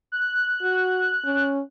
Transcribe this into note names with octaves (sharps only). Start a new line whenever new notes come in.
F#6
F#4
C#4